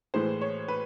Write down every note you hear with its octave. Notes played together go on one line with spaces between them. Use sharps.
A2 E3 G#3 C5
C#5
B4